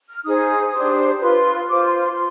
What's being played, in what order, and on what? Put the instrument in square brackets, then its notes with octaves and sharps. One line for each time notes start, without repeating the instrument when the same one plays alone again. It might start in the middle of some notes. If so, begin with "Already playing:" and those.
[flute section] F6
D#4 G#4 C5 D#6
D4 G4 C5
F4 B4 C6
F4 C5 D6
C6
C6